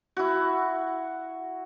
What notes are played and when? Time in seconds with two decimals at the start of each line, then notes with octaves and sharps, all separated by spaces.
0.17 E4 F#4